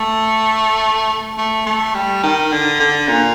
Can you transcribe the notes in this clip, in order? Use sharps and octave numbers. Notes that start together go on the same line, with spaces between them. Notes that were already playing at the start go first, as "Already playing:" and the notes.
Already playing: A3
A3
A3
G3
D#3
D3
D3
A#2